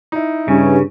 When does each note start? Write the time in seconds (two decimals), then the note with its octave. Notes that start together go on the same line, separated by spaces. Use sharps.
0.12 D#4 E4
0.48 G2 C#3 C#4